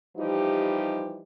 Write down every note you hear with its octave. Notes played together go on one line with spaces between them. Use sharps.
E3 F3 G3 D#4 G4